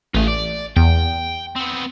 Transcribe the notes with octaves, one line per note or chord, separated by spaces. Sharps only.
A1 A3 F4 G#4
D5
E2 G5
B3 C4